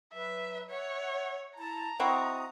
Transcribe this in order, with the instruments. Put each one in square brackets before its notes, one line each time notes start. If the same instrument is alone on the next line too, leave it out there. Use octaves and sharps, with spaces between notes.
[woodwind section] F#3 B4 [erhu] E5
[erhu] C#5 [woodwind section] E5 F#5
[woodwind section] E4 A5 [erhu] A#5
[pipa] C4 E4 F#4 [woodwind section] D#5 D#6